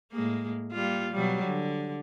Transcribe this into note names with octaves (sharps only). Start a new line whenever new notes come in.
A2 G#3 A#3
G3 A#3 F4
B2 F#3 G3
D3